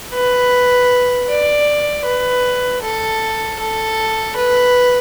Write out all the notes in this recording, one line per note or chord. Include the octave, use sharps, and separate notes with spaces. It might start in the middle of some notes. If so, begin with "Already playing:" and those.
B4
D5
B4
A4
A4
B4